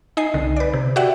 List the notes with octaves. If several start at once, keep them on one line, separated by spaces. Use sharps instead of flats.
D#4 D#5 G#5 C7
C2 D3
B4 D5
C3
F#4 G4 D5 E5 F#5 G5